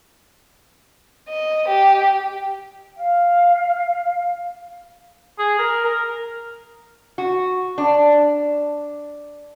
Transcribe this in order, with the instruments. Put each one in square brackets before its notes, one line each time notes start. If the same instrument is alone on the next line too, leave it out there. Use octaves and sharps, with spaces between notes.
[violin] D#5
G4
[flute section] F5
[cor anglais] G#4
A#4
A#4
[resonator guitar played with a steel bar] F#4
D4